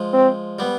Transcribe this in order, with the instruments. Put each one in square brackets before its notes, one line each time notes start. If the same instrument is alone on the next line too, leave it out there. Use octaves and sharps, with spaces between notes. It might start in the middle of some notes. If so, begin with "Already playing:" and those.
Already playing: [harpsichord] F3 G#3
[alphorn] C4
[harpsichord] G3 B3